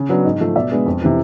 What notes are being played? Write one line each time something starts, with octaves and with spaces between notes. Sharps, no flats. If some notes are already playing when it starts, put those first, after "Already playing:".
Already playing: C#3
F#3 B3 D4
G#2 D#5
F3 A3
B2 D5 E5
G#3 B3 D4
F2
C3 E3